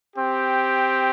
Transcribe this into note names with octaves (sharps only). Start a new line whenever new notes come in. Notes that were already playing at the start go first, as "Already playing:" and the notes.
C4 G4